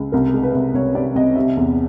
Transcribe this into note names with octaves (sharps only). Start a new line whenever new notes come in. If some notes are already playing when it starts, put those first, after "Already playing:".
Already playing: C#2
C2 A#4
G#3
B4
C2
C2 C#5
C3 D5
C2 D#5
C3 E5
E2